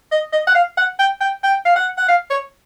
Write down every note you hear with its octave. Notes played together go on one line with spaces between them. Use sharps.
D#5
D#5
F#5
F5
F#5
G5
G5
G5
F5
F#5
F#5
F5
C#5